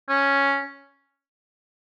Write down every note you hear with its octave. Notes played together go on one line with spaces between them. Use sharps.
C#4